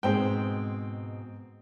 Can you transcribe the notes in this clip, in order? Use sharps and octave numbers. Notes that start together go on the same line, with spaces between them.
G#2 B2 G#3 C4 G5